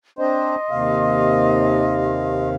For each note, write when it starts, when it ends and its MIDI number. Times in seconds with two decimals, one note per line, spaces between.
0.19 0.56 60
0.19 0.56 62
0.19 0.56 72
0.19 2.48 75
0.19 2.48 84
0.71 2.55 39
0.71 2.55 48
0.71 2.55 77